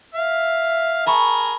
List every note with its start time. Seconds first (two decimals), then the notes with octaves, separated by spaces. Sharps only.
0.15 E5 F5
1.06 G#4 A#4 A5 B5 C#6